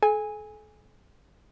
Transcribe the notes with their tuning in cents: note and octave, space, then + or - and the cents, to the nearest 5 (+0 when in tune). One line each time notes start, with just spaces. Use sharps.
A4 -40 G#5 -10